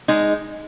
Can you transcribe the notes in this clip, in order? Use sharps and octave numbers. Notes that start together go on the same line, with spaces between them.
G#3 D#4